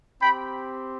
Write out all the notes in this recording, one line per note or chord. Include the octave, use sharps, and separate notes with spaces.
C4 G4 G5 B5